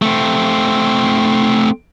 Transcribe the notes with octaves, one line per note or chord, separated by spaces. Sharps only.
A3 C4